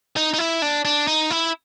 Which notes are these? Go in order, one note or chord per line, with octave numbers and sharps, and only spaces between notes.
D#4
D#4
E4
D4
D4
D#4
E4